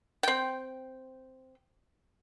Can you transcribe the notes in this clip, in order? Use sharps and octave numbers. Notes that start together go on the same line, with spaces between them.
C4 G5